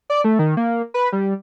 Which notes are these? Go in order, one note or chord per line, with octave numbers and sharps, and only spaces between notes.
D5
A3
D#3
A#3
B4
G3